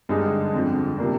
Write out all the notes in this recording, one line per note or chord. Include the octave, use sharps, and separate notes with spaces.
G2 D3 G#3 D#4 G#4
F2 D3 F3
C3 F3 A#3 D4